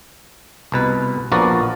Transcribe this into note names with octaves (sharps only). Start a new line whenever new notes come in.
C2 B2 B4
A#1 F3 B3 F#4 A#4 D5